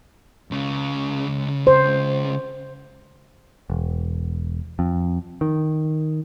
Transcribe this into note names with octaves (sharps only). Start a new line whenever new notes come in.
C#2 C#3
C5
E1
F2
D#3